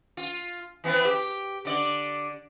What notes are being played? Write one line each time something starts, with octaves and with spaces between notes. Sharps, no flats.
F4
E3 B3 C4
G4
D3 D5